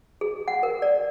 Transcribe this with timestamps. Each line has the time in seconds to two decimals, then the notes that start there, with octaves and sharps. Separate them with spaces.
0.21 G#4
0.48 F#5
0.63 A#4
0.82 D5